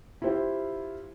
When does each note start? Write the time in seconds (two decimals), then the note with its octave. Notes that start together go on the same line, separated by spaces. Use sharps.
0.22 E4 F4 G4 C5